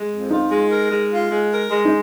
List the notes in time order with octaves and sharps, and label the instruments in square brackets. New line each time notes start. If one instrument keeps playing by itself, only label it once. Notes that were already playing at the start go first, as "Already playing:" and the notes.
Already playing: [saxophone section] G#3
F2
[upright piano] D#4 [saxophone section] F4
[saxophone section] G#3
A#4
G#3
F4
G#3
A#4
G#3
[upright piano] D#4